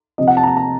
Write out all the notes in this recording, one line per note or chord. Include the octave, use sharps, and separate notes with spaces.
C3 F3 C4 D#5
F#5
A5
A#5
A5
A#5